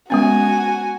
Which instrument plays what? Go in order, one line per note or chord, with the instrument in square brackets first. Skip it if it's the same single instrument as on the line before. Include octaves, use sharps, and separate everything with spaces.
[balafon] G#3 B3 C#4 [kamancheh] F#4 G#5